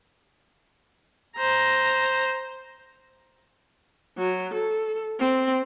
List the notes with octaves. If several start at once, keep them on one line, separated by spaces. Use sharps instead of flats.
C5 A#5
F#3
A4
C4